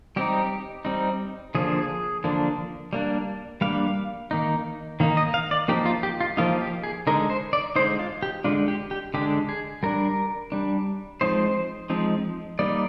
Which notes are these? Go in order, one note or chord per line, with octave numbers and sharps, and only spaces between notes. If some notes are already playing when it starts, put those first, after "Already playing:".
G3 C4 D#4 G4
G3 C4 D#4
D3 F3 A#3 D4 G#4
D3 F3 A#3 D4
G3 A#3 D4
G3 A#3 D4 F5
D#3 A#3 D#4
D#3 A#3 D#4
D#5
F5
D5
F3 A#3 D#4 G4
F4
G4
F4
F3 A#3 D#4 F4
G4
G#4
D3 G#3 D#4 A#4
C5
D5
D3 G#3 D#4 C5
F4
G4
D3 G#3 D4 F4
G4
G4
D3 G#3 D4 G4
G#4
G3 D4 A#4
G3 D4
F3 G#3 C4 D#4 C5
F3 G#3 C4 D#4
G3 A#3 D#4 D5